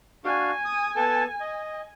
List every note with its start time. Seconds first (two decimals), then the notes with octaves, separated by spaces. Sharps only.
0.24 D4 F#4 F5 G#5
0.65 D#6
0.96 B3 A4 A5
1.40 D#5